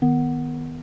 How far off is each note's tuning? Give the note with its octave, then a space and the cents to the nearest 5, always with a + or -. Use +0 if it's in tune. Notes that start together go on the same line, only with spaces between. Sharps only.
D#3 +0 B3 +0